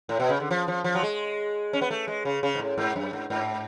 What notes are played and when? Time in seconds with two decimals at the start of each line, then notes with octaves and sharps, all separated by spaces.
0.09 A2
0.20 B2
0.29 C#3
0.40 D3
0.51 F3
0.68 F3
0.84 F3
0.95 F#3
1.03 G#3
1.73 C#4
1.81 B3
1.91 A3
2.08 G#3
2.25 C#3
2.43 C#3
2.55 G#2
2.60 A2
2.78 G#2
2.96 F#2
3.13 G#2
3.30 G#2